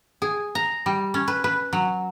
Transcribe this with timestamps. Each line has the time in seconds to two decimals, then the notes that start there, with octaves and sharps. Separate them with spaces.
0.22 G#4
0.55 A#5
0.86 G3
1.14 C#4
1.28 B4
1.44 B4
1.73 F#3